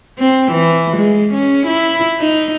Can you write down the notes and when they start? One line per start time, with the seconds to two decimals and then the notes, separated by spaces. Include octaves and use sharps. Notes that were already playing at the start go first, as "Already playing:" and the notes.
0.19 C4
0.52 E3
0.98 G#3
1.33 C#4
1.67 E4
2.20 D#4